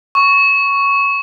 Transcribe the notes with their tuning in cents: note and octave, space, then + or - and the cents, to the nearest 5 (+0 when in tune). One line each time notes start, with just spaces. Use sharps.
C#6 +5